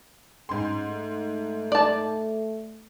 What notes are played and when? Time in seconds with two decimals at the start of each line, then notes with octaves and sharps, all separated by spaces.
0.49 G#2 C#4 C6
0.88 A3
1.72 D5 A5